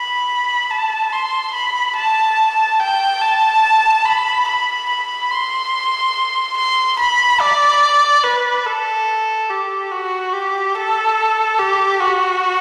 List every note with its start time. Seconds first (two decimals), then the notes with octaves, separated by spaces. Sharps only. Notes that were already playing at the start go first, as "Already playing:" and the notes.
Already playing: B5
0.70 A5
1.12 C6
1.54 B5
1.96 A5
2.80 G5
3.21 A5
4.05 B5
4.47 B5
4.89 B5
5.31 C6
6.57 C6
6.98 B5
7.40 D5
8.24 B4
8.66 A4
9.50 G4
9.91 F#4
10.33 G4
10.75 A4
11.59 G4
12.00 F#4